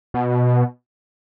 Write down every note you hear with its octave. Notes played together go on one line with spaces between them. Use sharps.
B2